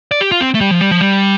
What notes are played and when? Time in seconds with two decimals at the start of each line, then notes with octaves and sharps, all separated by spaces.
0.11 D5
0.21 G4
0.32 F4
0.41 C4
0.55 A3
0.61 G3
0.71 F3
0.81 G3
0.91 F3
1.01 G3